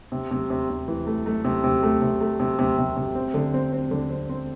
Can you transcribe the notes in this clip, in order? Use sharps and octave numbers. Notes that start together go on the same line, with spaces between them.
C3
C3
C3
C3
E3
A3
A3
C3
C3
A3
C3
A3
C3
C3
C3
C3
C4
D3
C4
C4
D3
C4
C4